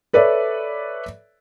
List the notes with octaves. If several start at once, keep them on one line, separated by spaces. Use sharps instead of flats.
A4 B4 C#5 D5 E5